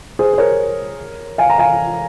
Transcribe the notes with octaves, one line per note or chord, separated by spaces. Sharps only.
G#4 C5
C5
A#4 C#5
F5 G#5
A#5
F5 G#5